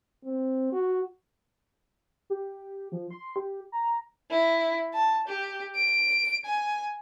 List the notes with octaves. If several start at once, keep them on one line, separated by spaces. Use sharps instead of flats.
C4
F#4
G4
F3
C6
G4
A#5
E4
A5
G4
D7
G#5